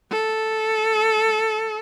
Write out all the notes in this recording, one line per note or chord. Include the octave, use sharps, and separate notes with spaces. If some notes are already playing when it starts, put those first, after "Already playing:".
A4